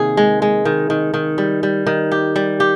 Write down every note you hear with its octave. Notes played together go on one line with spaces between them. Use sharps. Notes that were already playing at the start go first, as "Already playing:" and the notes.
Already playing: C3 D#3 A#3 G#4
G#3
G#3
D#3
D#3
D#3
G3
G3
D#3
G4
G3
G4